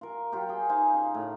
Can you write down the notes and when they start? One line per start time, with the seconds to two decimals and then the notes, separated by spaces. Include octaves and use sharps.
0.01 F4 A#4
0.32 F#3 F4 G4
0.49 G#4 G5
0.69 D#4 C5 F5 G#5
0.94 C#3
1.14 A2